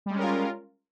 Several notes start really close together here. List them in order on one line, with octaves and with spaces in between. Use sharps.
G3 G#3 C#4 A#4 F4